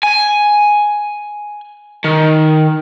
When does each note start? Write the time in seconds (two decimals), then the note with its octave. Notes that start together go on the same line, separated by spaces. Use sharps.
0.03 G#5
2.04 D#3